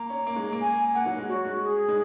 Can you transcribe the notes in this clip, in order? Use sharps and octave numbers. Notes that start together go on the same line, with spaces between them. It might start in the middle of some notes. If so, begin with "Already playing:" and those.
Already playing: A#3 A#5
C#4
A#3
G#3
A#3
G#5
A#3 F#5
F#3
G#3
C#4 F#4
G#3
G#4
G#3